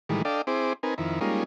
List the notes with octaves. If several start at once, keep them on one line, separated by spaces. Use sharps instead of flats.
A2 D#3 E3 G3 G#3
D4 A4 D5 D#5 F5 G5
C4 E4 G#4 C5 D6
C4 D#4 A#4 B4 G#5
F2 D#3 E4
G3 G#3 A#3 C#4 D#4 F4